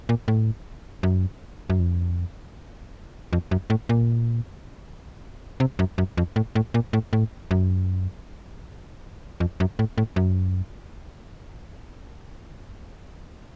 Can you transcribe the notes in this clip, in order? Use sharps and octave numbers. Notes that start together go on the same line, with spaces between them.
A#2
A2
F#2
F#2
F2
F2
F#2
A2
A#2
C3
F#2
F#2
F2
A2
A2
A#2
A2
A2
F#2
F2
F#2
A2
A2
F#2